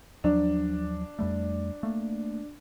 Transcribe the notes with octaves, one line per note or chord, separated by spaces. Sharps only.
D#2 F3 F#3 D4
F2 G3 A3
A3 A#3